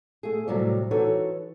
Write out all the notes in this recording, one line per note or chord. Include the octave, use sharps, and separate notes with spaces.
A3 G#4
A2 C3 F#3 G3
E3 D#4 F#4 A4 C#5